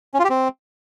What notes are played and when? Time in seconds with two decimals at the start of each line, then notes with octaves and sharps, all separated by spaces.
0.14 C#4
0.19 F4
0.24 G4
0.30 C4